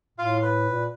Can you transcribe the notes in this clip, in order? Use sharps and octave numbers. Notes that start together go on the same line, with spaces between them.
A2 F4 F5
B4
A#2